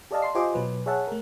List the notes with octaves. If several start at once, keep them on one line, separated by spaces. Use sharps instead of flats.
G4 A4 D5 D#5 F5 A5
A5 C6 C7
F4 G4 C5 D#5 G#5 D6
B2 F#3 B4
G#4 C#5 E5 F#5 A5
A3 A#4